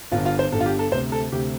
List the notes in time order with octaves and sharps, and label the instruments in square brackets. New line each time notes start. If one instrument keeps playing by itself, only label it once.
[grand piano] G1 G2 D3 F4
F4
C5
G1 G2 D3 A4
F4
G4
A4
D2 C3 C5
A4
D2 C3 G4